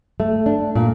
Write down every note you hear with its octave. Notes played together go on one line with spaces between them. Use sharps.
A3
D4
A#2